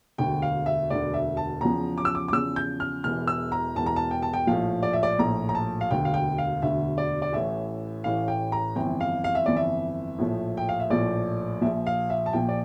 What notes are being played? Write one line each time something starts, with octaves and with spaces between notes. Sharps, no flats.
E1 D2 D3 G5
F5
E5
E1 D2 D3 D5
E5
A5
E2 C#3 F3 A#5
D6
E6
D6
D6
E2 C#3 F3 E6
G6
F6
E1 E2 E3 F6
E6
A#5
E1 E2 E3 A5
A#5
A5
G5
A5
G5
A#1 A2 F3 F5
D5
E5
D5
A#1 A2 F3 A#5
A#5
A5
F5
E1 D2 D3 G5
F5
G5
F5
E1 D2 D3 E5
D5
D5
A1 A2 E3 E5
A1 A2 E3 F5
G5
A#5
G1 F2 E3 G5
F5
F5
E5
G1 F2 E3 D5
E5
A#1 A2 F3
G5
F5
E5
A#1 A2 F3 D5
A#1 A#2 F3 E5
F5
E5
A5
A#1 A#2 F3 G5
D5